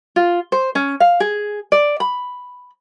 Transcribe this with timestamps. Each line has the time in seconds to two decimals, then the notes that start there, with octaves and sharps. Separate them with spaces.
0.16 F4
0.52 C5
0.75 C#4
1.00 F5
1.20 G#4
1.72 D5
2.00 B5